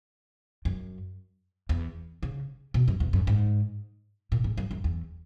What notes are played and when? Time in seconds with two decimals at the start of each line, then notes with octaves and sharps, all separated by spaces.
0.65 F#2
1.69 E2
2.23 C#3
2.74 B2
2.88 F#2
3.00 E2
3.13 F#2
3.27 G#2
4.32 A#2
4.44 G#2
4.58 F#2
4.71 F#2
4.84 E2